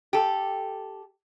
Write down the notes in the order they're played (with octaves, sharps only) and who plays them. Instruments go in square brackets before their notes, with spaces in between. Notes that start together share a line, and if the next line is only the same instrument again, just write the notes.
[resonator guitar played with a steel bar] G4 A4